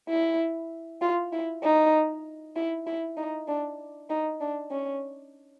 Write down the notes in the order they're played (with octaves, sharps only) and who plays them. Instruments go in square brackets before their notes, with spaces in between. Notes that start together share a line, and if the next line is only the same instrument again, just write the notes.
[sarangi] E4
F4
E4
D#4
E4
E4
D#4
D4
D#4
D4
C#4